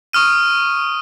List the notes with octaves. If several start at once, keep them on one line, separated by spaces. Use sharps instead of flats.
C#6 D#6 F6 D#7